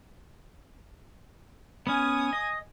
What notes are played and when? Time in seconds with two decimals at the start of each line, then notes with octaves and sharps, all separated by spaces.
1.87 B3 C#4 G#5 D#6
2.33 D#5